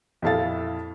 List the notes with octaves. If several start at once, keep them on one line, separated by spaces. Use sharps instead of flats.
F2 A#2 E4 A4 F5 A6